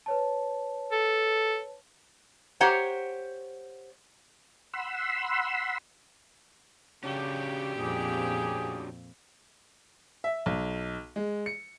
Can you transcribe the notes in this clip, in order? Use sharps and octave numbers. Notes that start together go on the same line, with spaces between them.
B4 C#5 A5
A4
G4 C5 C#5 F#5 A#5
F#5 B5 C6 E6
C#3 C#4 D4 F#4 G4
F2 A#2 C4 G#4
E5
B1
G#3
C#7